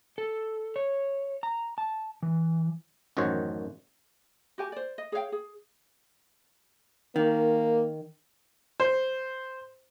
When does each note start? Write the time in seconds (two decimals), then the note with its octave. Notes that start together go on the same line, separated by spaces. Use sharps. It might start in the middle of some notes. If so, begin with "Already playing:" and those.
0.18 A4
0.76 C#5
1.43 A#5
1.78 A5
2.23 E3
3.17 A1 F#2 D#3 F#4 C5 C#5
4.58 F#4 G4 G#5
4.72 C5 D5
4.98 D#5
5.12 G#4 C#5 F5 G5
5.32 G#4
7.16 D#3 A#3
8.80 C5